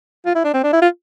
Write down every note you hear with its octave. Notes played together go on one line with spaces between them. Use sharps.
F4
E4
D4
C4
D4
E4
F4